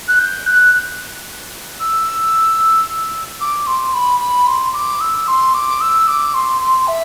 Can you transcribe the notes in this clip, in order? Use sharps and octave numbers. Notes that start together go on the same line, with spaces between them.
F#6
G6
F#6
E6
D6
C6
B5
B5
C6
D6
E6
C6
D6
E6
D6
C6
C6
E5